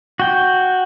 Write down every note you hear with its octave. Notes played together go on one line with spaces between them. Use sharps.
F#4 G5